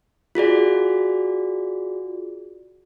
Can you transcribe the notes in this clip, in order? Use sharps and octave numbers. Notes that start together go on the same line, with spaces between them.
F4 F#4 G#4 D5